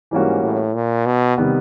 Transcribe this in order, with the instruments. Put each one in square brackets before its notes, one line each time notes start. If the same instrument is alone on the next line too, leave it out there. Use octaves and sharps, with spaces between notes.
[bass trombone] G#2 [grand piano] E3 G3 A#3 C#4 F#4
[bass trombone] A2
A#2
B2
[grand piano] C3 D#3 G3 B3